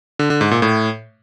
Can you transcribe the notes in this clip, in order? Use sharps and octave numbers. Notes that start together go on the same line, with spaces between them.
D3
D3
G#2
A#2
A2